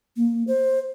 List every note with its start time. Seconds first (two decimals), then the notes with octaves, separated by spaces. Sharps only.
0.16 A#3
0.47 C5